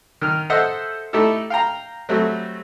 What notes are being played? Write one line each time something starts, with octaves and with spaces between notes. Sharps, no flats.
D#3 F6
A4 C5 D#5 E5 F#5
A3 D#4 E4 G4 A4
F5 G5 A#5
F#3 G3 A3 C4